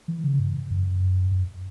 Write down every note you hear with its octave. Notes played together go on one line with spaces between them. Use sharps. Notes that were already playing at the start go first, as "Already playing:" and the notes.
E3
C#3
G2
F#2
F#2